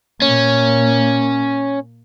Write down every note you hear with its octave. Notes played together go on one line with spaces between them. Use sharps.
A#2 A#3 C#4